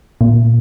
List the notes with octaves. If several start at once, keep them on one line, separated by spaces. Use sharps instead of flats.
A#2